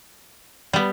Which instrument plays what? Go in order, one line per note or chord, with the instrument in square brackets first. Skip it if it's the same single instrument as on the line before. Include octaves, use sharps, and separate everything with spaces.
[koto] G3 B3